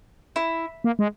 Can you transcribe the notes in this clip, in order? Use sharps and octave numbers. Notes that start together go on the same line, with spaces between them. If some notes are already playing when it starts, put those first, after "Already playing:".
E4
A#3
G#3